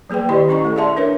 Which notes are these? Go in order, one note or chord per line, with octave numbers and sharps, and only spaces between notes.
F#3 A#3 G#4 B4 G5
D#3 E4 G4 D5 D#5 B5
C#4 E4 D#5 A#5 C#6
A3 A4
G#4 D5 E5 A5 C6
D4 A#4 B4 C#5 E5